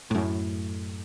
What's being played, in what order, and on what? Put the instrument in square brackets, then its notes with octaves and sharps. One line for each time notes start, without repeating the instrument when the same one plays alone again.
[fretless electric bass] F#2 A2